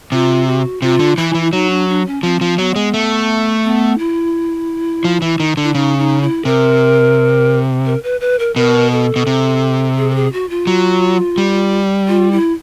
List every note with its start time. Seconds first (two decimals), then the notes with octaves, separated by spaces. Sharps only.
0.12 C3 F4
0.47 F#4
0.82 C3 F4
0.99 D3
1.17 E3 E4
1.34 E3
1.45 E4
1.52 F#3 D#4
1.70 D4
1.88 D4
2.06 C#4
2.23 F3 C4
2.41 F3
2.58 F#3 B3
2.76 G#3
2.94 A3
3.64 B3
3.98 E4
5.04 F3
5.22 E3
5.40 D#3
5.57 D3
5.63 E4
5.75 C#3 D#4
5.98 D#4
6.22 E4
6.45 C3 A#4
7.86 A#4
8.03 B4
8.20 B4
8.39 A#4
8.56 B2 A#4
8.92 A4
9.16 B2
9.27 C3
9.98 G#4
10.11 A4
10.15 G#4
10.33 F#4
10.50 F4
10.67 F#3
11.38 G3
12.08 F4
12.32 E4